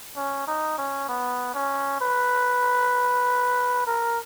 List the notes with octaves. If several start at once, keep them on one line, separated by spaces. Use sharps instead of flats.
C#4
D#4
C#4
B3
C#4
B4
A#4